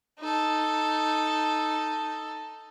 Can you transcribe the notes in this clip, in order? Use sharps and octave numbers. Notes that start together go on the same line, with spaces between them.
D#4 A4